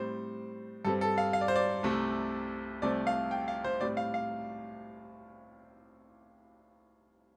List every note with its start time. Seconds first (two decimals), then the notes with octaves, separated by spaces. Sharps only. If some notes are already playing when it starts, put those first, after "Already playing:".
Already playing: A2 G3 C4 C5
0.85 G2 G3 C4 A4
1.01 A4
1.18 F5
1.33 F5
1.41 D5
1.48 C5
1.56 D5
1.83 C2 C3 A3 C4
2.82 C2 C3 A3 C4 D5
3.07 F5
3.31 G5
3.48 F5
3.64 C5
3.81 A2 G3 C4 D5
3.97 F5
4.14 F5